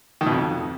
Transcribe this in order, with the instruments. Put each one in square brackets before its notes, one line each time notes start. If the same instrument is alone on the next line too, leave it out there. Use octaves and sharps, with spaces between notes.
[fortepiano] D#3
B2
F2